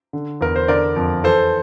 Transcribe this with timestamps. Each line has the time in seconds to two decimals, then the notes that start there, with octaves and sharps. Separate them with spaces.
0.13 D3
0.41 E2 A#4
0.56 C5
0.68 D3 A#4 D5
0.96 F2
1.24 E3 A4 C5